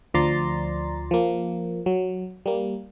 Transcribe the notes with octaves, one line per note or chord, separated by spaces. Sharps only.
D2 F3 D5 A#5 C6 A6
F3 A#3
F#3
G3 A#3